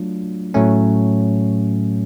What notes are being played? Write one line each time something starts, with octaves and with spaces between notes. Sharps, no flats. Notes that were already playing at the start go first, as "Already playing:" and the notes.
Already playing: F#3 A3 D4 F4
A2 F#3 A3 C#4